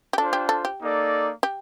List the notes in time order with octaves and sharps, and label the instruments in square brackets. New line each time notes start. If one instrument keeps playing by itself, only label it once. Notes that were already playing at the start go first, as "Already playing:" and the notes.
[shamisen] G4
[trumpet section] D4 F4 C5 [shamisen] A4
[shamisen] G4
A4
G4
[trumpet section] A#3 D#4 A4 D5
[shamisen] G4